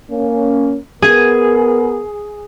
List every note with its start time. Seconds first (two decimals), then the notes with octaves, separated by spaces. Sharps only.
0.11 A#3 C#4
1.02 B3 G#4 A#4